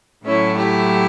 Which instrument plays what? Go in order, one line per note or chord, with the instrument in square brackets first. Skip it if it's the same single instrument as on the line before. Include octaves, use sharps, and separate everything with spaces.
[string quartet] A2 F#3 A3 C#4 E4
E4 G4